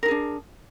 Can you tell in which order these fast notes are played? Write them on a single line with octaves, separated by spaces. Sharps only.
A#4 D#4 G#4 D4